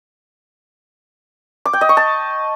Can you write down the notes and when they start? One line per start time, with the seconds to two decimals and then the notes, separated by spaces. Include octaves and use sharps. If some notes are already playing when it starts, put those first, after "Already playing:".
1.65 D6
1.73 G5
1.81 D#5
1.89 C#6
1.97 A5